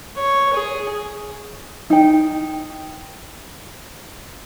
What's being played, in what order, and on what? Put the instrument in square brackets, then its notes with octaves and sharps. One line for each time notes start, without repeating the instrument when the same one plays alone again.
[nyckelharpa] C#5
G#4
[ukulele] D#4 G5